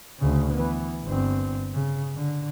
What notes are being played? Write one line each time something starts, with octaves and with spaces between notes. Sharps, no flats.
D2 C#3
E3 B3
G1 C4
C#3
D3